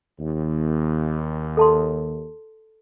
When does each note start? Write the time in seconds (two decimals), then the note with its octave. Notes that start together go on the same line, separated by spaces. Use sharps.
0.19 D#2
1.57 A4 A5 C6